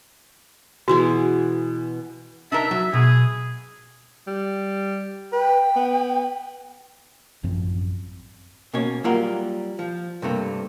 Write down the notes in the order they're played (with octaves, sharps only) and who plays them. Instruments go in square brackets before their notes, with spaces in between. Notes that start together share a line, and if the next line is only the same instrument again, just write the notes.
[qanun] B2 E3 G#4 [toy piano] F#4
[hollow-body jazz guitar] D4 D#4 A#4 [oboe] E5
[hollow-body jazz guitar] F#3
[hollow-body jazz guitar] B2 [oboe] G#4
[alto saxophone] G3
[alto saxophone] B4 [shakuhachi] G5
[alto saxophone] B3
[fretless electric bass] A1 F#2 F3 C4
[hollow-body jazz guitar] B2 A#3 C#4 C#5
F#3 G3 A#3 F4 A#4 F#5
F3
G2 C3 A3 A#3